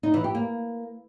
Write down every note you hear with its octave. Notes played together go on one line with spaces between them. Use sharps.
D#4
E3
G4
A#3